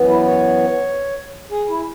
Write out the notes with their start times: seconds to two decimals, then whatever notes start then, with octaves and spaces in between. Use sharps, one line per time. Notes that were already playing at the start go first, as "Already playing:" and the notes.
Already playing: F#2 E3 B3
0.09 E4
0.27 C#5
1.51 G#4
1.69 E4